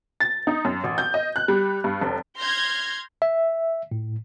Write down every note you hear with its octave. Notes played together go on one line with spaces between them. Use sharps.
A6
D#4
F#2
A1
G6
D#5
F#6
G3
G2
F1
C6 F6 G6 G#6 A#6
E5
A2